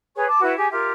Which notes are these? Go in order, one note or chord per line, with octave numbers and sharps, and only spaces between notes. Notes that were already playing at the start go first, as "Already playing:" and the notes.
G#4 B4 C#5 C#6
A5 D6
E4 F#4 B4
G4 G#4 G#5
F4 G4 A#4 E5